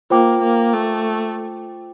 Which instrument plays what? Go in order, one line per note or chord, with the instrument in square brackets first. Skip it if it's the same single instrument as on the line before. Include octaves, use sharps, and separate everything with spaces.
[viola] A#3 [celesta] F4 C5 G5 D6
[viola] A#3
A3